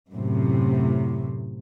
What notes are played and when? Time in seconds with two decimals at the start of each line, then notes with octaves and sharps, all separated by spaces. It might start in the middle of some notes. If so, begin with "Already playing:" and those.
0.11 F#2 A2 C3